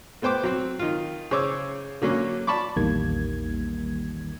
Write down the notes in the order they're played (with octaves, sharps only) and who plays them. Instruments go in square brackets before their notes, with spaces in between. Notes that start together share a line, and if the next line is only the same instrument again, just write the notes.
[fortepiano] A3 B3 C5 G5 D6
F#3 C4
D#3 F4
C#3 C5 C#5 D6 E6
D3 F#3 A#3 C#4
D5 A5 B5 C#6 D6
[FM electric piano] A#1 E2 D#3 G3 A#3 G#6